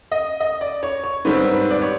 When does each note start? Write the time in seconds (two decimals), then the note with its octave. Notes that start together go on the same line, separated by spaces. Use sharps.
0.11 D#5
0.40 D#5
0.61 D5
0.83 C#5
1.04 C#5
1.25 G#2 D#3 G3 C4 B4
1.53 B4
1.71 D5
1.82 C#5